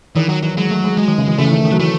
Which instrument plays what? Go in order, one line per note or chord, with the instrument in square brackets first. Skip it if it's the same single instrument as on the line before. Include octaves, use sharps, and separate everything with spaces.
[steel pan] D#3 [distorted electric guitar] E3
[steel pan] D#3 [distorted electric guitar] F#3
[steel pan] E3 [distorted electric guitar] F#3
[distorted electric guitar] F#3 [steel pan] G#3
[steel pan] A3
G#3
[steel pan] F#3 [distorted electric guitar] G#3
[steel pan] D#3
C#3
E3
[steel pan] C#3 [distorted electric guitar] A3
[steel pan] E3
D#3
D#3
F#3
[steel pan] E3 [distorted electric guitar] A3